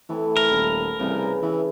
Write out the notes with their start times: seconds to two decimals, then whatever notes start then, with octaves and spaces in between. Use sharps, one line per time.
0.09 E3 A3 C4 E4
0.37 E4 A#4
0.51 D#1
0.99 C2 C#3 E3
1.43 E3 E5